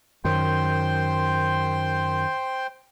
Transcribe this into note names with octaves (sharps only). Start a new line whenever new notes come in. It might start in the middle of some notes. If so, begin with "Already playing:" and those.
F#2 D#3 C5 G5 C6